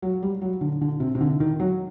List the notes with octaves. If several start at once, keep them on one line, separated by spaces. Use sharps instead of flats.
F#3
G3
F#3
D3
D3
C3
C3
D3
D#3
F#3